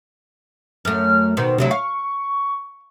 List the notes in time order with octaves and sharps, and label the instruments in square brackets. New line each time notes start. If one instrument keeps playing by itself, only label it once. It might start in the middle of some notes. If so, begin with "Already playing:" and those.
[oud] F#2 A3 [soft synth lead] F6
[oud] B2 D#3 [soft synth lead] C5
[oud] D2 F#3 E4 [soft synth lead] C3
[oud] F5 [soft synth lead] C#6